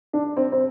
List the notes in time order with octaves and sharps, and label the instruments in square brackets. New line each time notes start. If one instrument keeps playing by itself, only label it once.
[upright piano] D4
C4
C4